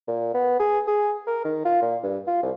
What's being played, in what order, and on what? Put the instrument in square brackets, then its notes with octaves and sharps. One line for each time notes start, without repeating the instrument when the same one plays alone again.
[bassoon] A#2
B3
G#4
G#4
A#4
D#3
F4
A#2
G2
F4
C2